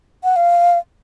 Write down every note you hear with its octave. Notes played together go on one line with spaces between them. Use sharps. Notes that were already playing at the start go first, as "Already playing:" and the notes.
F#5
F5